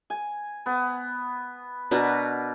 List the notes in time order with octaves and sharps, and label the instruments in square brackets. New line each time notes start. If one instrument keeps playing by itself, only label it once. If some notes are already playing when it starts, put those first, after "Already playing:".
[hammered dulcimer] G#5
B3
[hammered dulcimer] B2 A#4 [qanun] D4 F#4 B4